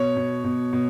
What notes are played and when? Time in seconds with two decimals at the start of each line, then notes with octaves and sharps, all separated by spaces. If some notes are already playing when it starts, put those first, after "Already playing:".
Already playing: B2 C#5
0.16 B2
0.44 B2
0.73 B2